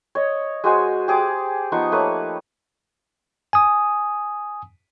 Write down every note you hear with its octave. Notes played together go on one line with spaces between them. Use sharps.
C#5 D#5
G#3 F#4 C5 G#5
G4 G#4 D6
F3 B3 D#4 C#6
A3 A#3 B4 C#5
G#5 D#6